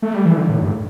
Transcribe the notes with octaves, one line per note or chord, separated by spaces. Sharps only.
A3
G3
E3
D3
A2
G2